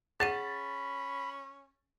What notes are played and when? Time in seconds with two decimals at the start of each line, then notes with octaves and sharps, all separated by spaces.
0.20 C#4 G#4 F#5 B5 A6 D#7